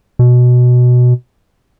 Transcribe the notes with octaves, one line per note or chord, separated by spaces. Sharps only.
B2